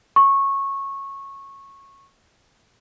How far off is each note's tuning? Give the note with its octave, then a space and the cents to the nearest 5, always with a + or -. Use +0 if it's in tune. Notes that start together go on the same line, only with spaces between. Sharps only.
C#6 -15